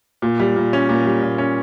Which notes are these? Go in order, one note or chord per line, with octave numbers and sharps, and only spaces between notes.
A#2
G3
A#2
C#4
A#2
G3
A#2
C#4